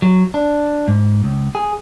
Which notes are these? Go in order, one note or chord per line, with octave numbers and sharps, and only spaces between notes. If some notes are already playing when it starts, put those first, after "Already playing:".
F#3
D4
G#2
C#2
G#4